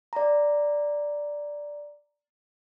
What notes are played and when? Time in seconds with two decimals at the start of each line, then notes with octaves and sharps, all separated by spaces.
0.13 D5 A#5